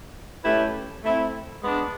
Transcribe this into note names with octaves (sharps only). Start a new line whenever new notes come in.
A3 C#4 E4 G4 B4
A3 C4 E4
G#3 B3 D4